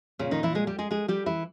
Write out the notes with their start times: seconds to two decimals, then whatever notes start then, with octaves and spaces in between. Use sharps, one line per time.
0.19 A#2 C#3 C#4
0.31 D#3 D#4
0.43 E3 E4
0.55 G#3 G#4
0.67 G3 G4
0.79 G#3 G#4
0.91 G#3 G#4
1.08 G3 G4
1.26 E3 E4